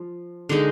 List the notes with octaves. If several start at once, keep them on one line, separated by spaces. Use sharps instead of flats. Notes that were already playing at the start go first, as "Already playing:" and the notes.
Already playing: F3
D3 G#3 D#4